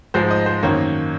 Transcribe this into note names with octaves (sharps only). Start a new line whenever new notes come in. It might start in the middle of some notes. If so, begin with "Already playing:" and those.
G#2 F3 G#3 C5
D#5
C5
F#2 D#3 A#3 C#5